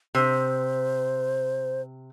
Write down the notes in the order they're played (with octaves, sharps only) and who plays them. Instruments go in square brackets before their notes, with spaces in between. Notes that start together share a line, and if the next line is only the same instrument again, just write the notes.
[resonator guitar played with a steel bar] C3 [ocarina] C5